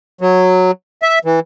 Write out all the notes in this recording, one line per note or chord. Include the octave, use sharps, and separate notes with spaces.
F#3
E5
E3